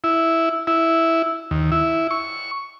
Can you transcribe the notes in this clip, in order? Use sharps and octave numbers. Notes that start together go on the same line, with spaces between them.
E4
E4
D#2
E4
C#6